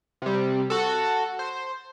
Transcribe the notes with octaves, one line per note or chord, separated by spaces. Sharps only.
C3 G3
F#4 A4
C5